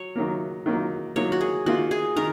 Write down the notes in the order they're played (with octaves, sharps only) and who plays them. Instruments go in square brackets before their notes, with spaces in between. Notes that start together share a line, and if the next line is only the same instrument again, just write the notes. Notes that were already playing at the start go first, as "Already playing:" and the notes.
Already playing: [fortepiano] F#3 [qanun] C#5
[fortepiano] D#3 F#3 A#3
D#3 F#3 A#3
[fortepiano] D#3 F#3 A#3 [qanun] C#5
[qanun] F#4
G#4
[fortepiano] D#3 A#3 F4 [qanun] F#4
[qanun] G#4
[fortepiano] D#3 [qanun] A#4